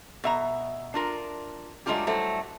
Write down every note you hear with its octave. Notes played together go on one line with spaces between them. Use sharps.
B2 E5 A#5
D4 F4 A#4
F#3 G#3 A3 D4 F4 G4
F#3 G3 A3 E4 C5